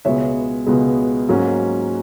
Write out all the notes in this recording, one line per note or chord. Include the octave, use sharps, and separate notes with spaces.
C#2 B2 G#3 B3 C#5 E5
C#2 B2 G#3 B3
G#2 F#3 A#3 C#4